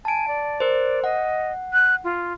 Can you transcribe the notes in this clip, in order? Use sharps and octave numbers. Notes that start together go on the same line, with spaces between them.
G#5 A5 D7
D5
A#4 C5
D#5 F#5
F#6
F4